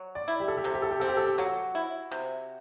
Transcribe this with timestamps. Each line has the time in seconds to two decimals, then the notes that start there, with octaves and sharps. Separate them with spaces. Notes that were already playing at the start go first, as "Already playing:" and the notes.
Already playing: F#3
0.15 D5
0.28 E4
0.40 G4
0.48 A4
0.57 G4
0.64 C3 A4
0.74 G4
0.82 A4
0.91 G4
1.00 C4 A4
1.08 G4
1.17 A4
1.25 G4
1.38 F#3 F#4
1.75 E4
2.12 C3